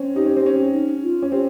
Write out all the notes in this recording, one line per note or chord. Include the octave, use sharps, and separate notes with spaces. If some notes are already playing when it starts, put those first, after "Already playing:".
Already playing: C4 C#4
D#4 G4
C#4
C4
C#4
D#4
F4
C#4
C4 G4